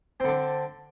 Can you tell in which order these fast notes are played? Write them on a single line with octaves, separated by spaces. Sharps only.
C4 D3 D4